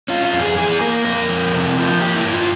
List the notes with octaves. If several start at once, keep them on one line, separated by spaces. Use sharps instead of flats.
C#4 F4
F4
F2
G#4
E3 G#4
A#3 A#4
F2 A#4
F2
C3
F3
A#3 G4
E4
G2
F4